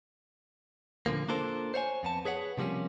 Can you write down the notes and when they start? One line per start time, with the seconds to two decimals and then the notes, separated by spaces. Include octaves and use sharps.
1.06 A#2 D3 F3 A#3
1.28 A#3 D4 F4 A4 A#4 C5
1.74 C5 C#5 F5 G#5
2.03 F2 B3 A5
2.25 G#4 B4 C#5 F#5
2.57 C3 F3 G3 A#3 C#4